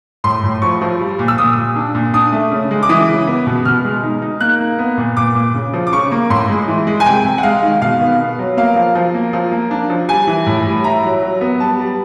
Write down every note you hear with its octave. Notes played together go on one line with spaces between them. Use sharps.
A2 C6
A2
F3 C#6
F3
G3
A#2
E6
A#2 D#6
A#2
D4
A#2
D4 D#6
A3
C#3
G#3
D6
E3 D#6
C#3
B3
B2
B2 F6
G#3
D#4
D#4
A#3 F#6
A#3
B3
A#2
A#2 D6
A#2
C#3
F3
D6
C#3 C#6
A#3
A2 C6
G#3
E3
G#3
G#5
C3 G5
C3
F#5
G#3 F5
D#3
B2 F5
B3
B3
F#3
A#3 F5
F3
F3
A#3
F3
A#3
D4
F3
G3 G#5
E3
A2
G3
E4 A#5
F#3
F#3
B3
G3 A5
G3